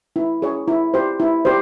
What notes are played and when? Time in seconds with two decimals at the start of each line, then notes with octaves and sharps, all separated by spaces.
0.16 E4
0.42 G#4 C#5
0.68 E4
0.94 G4 C5
1.20 E4
1.45 G4 C5